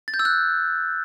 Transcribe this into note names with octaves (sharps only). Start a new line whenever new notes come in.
A6
G6
E6
F#6